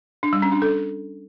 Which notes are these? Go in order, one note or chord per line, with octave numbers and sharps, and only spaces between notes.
D4
G3
C#4
D4
A4